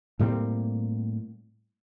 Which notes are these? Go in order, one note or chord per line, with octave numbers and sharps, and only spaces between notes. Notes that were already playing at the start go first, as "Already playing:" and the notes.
A2 G3 A#3 C4